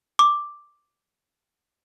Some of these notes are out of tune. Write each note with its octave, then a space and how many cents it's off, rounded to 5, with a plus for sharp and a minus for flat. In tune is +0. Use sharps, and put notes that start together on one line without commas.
D6 +0